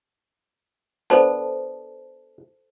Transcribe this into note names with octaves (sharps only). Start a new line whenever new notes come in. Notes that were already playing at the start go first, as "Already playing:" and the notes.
B3 D4 A4 C5 A5